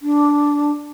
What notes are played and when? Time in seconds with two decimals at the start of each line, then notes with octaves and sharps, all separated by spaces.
0.02 D4